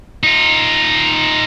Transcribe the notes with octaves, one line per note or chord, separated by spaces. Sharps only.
D#4 F4